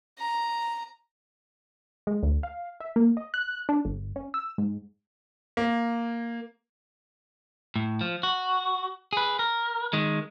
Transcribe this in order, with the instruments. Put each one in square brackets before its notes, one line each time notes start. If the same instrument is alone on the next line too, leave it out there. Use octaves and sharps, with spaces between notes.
[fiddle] A#5
[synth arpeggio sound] G#3
D2
F5
E5
A#3
D#5
F#6
D4
G1
C#4
E6
G#2
[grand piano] A#3
[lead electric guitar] A2
F3
F#4
G#4 B4
A#4
D#3 G#3